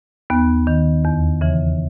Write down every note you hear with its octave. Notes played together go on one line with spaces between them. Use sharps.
D#2 B3
D#3
E2
C#3 E3